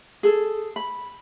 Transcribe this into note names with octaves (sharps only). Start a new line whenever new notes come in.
G#4 A4
B5